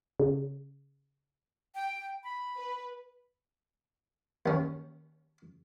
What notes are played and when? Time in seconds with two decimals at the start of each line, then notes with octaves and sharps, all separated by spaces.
0.20 C#3
1.75 G5
2.24 B5
2.56 B4
4.46 D#2 C#4